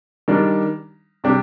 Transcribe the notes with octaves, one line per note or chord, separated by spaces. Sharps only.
D#3 G3 D4
C3 G3 D4 G4